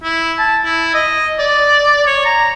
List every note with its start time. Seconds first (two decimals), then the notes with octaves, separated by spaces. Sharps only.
0.04 E4
0.39 A5
0.64 E4
0.94 D#5
1.39 D5
2.07 C#5
2.25 A#5